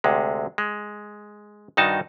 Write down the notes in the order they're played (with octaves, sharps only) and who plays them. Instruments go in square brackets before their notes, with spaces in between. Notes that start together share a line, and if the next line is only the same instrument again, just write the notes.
[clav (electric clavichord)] D2 C3 G#3
G#3
G2 D#3 D#4 F#4 A5